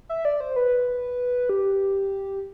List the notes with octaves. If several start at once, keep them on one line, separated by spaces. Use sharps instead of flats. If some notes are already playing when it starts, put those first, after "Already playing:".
E5
D5
C5
B4
G4